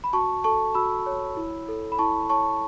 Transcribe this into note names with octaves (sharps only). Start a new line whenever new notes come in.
B5
F#4 A5 C#6
A4 A5 C#6
F#4 B5 E6
C#5
E4
A4
B5
E4 A5 C#6
C#5 A5 C#6